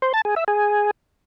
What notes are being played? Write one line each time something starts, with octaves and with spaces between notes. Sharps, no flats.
C5
A5
G#4
E5
G#4